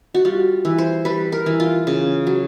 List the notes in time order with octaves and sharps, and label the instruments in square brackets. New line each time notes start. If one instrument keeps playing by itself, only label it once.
[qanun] F#4
G3 F4
E3
C5
G3 B4
A#4
E3
F4
C#3
F#3